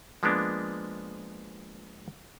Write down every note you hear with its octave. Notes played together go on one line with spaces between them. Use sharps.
F3 G#3 A#3 B3 D4